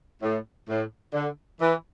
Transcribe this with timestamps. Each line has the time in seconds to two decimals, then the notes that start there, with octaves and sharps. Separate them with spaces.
0.23 A2
0.69 A2
1.14 D3
1.60 E3